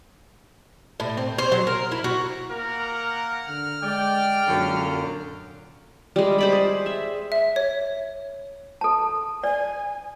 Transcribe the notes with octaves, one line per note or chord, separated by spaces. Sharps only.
A2
C4
C5
F#3
A#4
E4
F#4
A#3 A#4 F#5
D3 F6
G#3 D5 G5
F#2 A#2 D3 F#3
G3 G#3
C5 D5 B5
G#4
E5
E5
C#5
A4 A5
D5 G#5